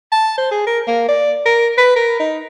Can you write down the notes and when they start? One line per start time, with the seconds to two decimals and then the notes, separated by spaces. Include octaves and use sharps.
0.12 A5
0.38 C5
0.51 G#4
0.67 A#4
0.87 A#3
1.09 D5
1.46 A#4
1.78 B4
1.96 A#4
2.20 D#4